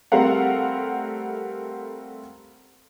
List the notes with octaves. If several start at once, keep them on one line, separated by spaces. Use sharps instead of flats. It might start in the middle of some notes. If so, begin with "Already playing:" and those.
G3 A3 C4 A#4 F5 F#5